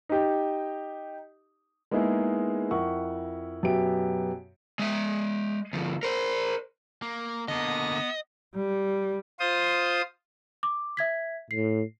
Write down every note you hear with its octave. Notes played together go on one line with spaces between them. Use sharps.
D#4 G4
G#3 A#3 B3 D#4 E4 G#4
F2 E4 A#4 F#5 C#6
F#2 B2 B3 G4 E5 D7
G#3 E5
D2 F3
A#4 C5
A#3
D3 A#3 B3 D#5
G3
F4 C5 D#6
D6
E5 G#6 B6
A2 C7